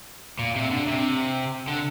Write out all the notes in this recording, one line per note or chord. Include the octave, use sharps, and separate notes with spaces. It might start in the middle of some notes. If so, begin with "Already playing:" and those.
A#2
C3
D3
C3
D3